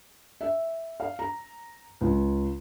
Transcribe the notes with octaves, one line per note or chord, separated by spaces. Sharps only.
E5
F5
A#5
C#2